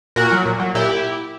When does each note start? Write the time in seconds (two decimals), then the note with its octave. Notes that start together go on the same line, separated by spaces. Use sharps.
0.16 A#2 F#4 A#4
0.32 F#3
0.46 A#2
0.60 F#3
0.75 A#2 E4 G4